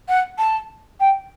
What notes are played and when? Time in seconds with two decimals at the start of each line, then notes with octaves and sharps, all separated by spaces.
0.08 F#5
0.38 A5
1.00 G5